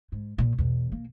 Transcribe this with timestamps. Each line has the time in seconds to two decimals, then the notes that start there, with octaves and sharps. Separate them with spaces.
0.12 G#2
0.38 A#2
0.58 E2 B2
0.92 A#3